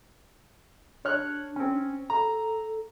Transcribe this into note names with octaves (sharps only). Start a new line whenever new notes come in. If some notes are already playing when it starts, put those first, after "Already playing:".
D4 C#5 F6 F#6
C4 C#4
A4 A#5